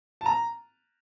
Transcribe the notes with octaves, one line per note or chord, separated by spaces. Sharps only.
A5
A#5